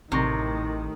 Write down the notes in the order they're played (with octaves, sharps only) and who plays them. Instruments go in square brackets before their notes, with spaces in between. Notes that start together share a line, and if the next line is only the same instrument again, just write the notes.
[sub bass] A1 [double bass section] A2 D#3 [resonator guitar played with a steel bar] C3 [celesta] A#5 C#6 A#6